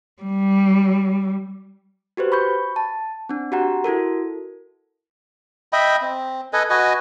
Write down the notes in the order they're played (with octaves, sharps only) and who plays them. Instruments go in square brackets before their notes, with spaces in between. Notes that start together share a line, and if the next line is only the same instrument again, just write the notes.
[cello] G3
[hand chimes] F#4 G4 B4 C5
B5 C#6 G6
A5
C4 D4
F#4 G4 F#5 A#5
E4 F#4 A4 A#4
[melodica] D#5 E5 G5 B5
C4
A4 B4 D#5 G#5
F#4 B4 D#5 G#5